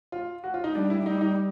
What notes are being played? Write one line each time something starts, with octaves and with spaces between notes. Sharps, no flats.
F4
F#4
F4
D#4
G3 D4
E4
G3 D#4
D#4